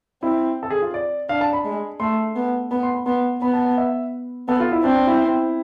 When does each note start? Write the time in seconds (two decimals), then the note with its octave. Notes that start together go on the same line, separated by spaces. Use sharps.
0.23 C4 E4
0.63 A4
0.70 G#4
0.82 F4
0.94 D5
1.29 D4 F5
1.41 A5
1.53 B5
1.64 G#3
2.00 A3 C6
2.35 B3
2.71 B3 B5
2.83 C6
2.95 B5
3.06 B3 C6
3.42 B3 B5
3.53 A5
3.65 A5
3.78 E5
4.48 B3 A4
4.60 F4
4.72 E4
4.84 C4 D4
4.96 D4
5.07 E4